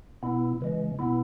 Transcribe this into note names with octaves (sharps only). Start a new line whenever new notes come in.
B2 B3 E4
C#3 E3 G#3
B2 B3 E4